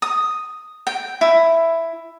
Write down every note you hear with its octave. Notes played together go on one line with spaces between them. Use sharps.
D#6
G5
E4